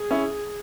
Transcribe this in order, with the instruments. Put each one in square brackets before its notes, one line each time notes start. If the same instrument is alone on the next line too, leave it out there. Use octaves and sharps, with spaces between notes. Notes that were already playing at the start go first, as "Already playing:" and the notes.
Already playing: [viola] G#4
[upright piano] C#4 E4